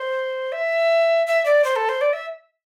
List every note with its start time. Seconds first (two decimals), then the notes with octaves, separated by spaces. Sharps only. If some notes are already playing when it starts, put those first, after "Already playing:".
Already playing: C5
0.52 E5
1.27 E5
1.45 D5
1.64 C5
1.76 A4
1.89 C5
2.01 D5
2.13 E5